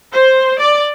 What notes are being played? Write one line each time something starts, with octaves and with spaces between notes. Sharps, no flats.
C5
D5